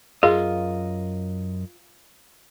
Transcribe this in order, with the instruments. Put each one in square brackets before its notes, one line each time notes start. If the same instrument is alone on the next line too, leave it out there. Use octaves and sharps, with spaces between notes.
[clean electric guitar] F#2 A#4 D#5 [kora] F4 [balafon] G#4